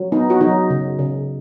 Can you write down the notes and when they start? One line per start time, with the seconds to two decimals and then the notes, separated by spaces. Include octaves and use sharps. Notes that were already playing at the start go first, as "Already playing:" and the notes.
Already playing: F#3
0.12 B3 D#4
0.30 F#4
0.41 F#3 D#4
0.70 C#3
0.99 C#3